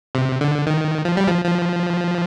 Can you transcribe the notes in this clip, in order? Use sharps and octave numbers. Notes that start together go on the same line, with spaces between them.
C3
D3
D#3
F3
G3
F3
F3